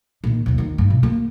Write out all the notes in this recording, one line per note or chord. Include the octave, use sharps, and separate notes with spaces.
A#2 D#3
D#2 C3
D#3 B3
G2
B2
A#3